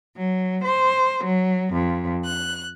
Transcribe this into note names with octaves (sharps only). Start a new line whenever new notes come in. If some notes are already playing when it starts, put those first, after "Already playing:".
F#3
C5
F#3
F2
F#6